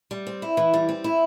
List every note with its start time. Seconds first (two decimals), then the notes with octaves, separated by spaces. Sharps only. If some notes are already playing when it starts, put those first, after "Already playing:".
0.11 G3
0.27 C4
0.42 E4
0.57 E3
0.74 G3
0.89 C4
1.04 E4